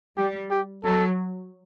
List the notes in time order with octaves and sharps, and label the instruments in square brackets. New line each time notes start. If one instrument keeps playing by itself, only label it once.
[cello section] G3 [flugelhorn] G4
[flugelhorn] G4
[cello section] F#3 [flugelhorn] A4